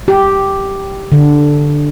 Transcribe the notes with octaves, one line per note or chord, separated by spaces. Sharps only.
G4
D3